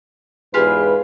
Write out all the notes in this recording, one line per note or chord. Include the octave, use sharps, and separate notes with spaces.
E2 G#2 F4 G4 G#4 B4